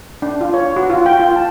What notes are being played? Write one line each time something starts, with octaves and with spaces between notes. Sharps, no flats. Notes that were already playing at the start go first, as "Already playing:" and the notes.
D4
F4
C#5
F#4
F4
G5
F4
A5